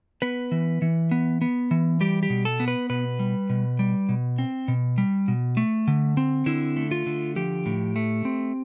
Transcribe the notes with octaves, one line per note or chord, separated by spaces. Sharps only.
B3 B4
E3
E3
B3
B3
E3
G3 G4
G4
B2
A4
B3
B4
B2 B4
G3
B2
G3
B2
C4
B2
G3
B2
A3
D3
C4
D3 E4
A3
F4
D3
F3 G4
A2
A3
C4